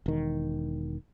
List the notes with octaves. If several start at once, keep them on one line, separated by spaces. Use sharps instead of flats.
E1 D#3